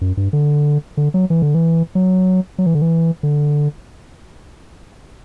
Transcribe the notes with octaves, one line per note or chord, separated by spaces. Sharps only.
F#2
G2
D3
D3
F#3
E3
D3
E3
F#3
F#3
E3
D3
E3
D3